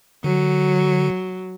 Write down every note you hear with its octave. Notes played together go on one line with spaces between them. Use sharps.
D3 F#3